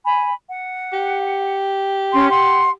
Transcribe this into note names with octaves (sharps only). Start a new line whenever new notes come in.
G#5 B5
F#5
G4
C#4 C6
F#5 C6